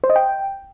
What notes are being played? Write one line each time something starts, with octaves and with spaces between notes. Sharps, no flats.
C5
D#5
G5